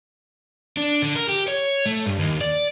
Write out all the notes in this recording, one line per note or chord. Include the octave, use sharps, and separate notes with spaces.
D4
D3
A#4
G4
C#5
A3
G2
D#2
D5